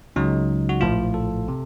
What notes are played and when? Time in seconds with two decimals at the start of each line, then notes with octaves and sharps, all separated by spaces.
0.16 C#2 C#3 F#3 D#4
0.69 F#4
0.81 A#1 A2 F3 F4
1.14 A4
1.48 C3